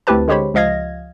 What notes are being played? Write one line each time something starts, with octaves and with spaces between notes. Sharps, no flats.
D2 C4 E4 G4 B4 A5
D3 G#3 G4 C5 C#5 B5
C#2 F3 D#5 F5 G#6 A#6